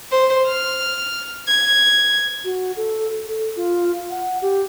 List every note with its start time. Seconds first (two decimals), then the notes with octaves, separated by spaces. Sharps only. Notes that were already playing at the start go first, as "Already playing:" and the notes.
0.11 C5
0.47 F6
1.48 G#6
2.44 F#4
2.76 A4
3.26 A4
3.56 F4
4.10 F#5
4.42 G4